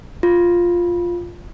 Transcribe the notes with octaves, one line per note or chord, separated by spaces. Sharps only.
F4